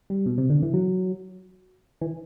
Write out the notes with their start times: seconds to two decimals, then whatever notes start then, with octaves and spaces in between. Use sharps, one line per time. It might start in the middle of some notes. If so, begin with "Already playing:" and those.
0.10 G3
0.26 B2
0.38 C3
0.50 D3
0.63 E3
0.74 F#3
2.01 E3